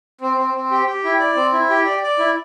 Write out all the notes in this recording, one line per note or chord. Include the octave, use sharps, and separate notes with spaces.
C4
C4
C4
G4
G4
E4
D5
C4
E4
G4
D5
D5
E4